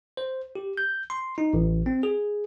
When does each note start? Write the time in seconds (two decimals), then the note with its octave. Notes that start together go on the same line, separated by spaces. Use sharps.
0.17 C5
0.55 G4
0.77 G6
1.10 C6
1.38 D#4
1.53 A1
1.86 C4
2.03 G#4